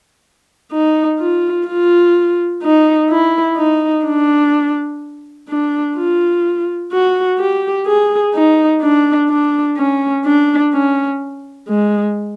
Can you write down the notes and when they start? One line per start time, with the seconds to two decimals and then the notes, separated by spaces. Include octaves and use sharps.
0.72 D#4
1.19 F4
1.67 F4
2.62 D#4
3.10 E4
3.57 D#4
4.05 D4
5.49 D4
5.96 F4
6.92 F#4
7.39 G4
7.87 G#4
8.34 D#4
8.82 D4
9.29 D4
9.77 C#4
10.25 D4
10.73 C#4
11.68 G#3